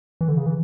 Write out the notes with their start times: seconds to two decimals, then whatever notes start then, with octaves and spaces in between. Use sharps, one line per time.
0.21 E3
0.28 D3
0.37 C#3
0.46 E3